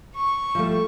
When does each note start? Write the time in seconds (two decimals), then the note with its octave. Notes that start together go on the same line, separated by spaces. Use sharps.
0.15 C#6
0.55 F3 G3 A3